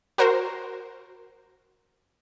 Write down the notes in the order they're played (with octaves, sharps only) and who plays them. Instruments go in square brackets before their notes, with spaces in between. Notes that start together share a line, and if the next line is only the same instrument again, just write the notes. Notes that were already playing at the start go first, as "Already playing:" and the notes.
[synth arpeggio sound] F#4 A#4 C5